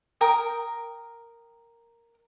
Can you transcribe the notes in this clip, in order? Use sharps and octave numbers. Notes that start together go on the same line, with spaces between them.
A#4 G5 D#6